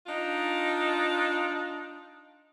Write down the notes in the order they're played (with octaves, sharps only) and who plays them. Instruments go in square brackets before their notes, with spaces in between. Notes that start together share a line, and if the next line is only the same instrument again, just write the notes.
[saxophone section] D4 D#4 F4